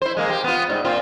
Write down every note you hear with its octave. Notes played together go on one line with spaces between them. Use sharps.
E4 C5
G#3 A#3
G4
B3 F4
G#2 G3
A#2 C4 F4